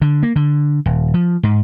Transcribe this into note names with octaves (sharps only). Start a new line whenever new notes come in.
D3
A#3
D3
D#1
F3
G#2